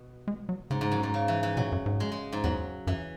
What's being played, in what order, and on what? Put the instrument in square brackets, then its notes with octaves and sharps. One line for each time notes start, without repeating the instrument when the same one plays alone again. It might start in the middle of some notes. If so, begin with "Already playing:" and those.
Already playing: [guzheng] B2
[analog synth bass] G#3
F#3
[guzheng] G#2 [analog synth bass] C#3
[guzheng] G#2
F#2
G#2
C#3
E3
E3
[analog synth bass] B2 [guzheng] F#3
[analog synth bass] F#2
G#2
[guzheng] G#3
G#3
G#2
[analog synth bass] E2 [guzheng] F#3
[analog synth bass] F#2 [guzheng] E3